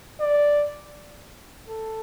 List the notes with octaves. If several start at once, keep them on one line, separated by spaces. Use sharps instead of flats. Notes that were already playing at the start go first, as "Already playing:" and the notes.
D5
A4